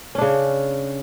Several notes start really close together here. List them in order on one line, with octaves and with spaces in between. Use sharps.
C#4 D4 C#3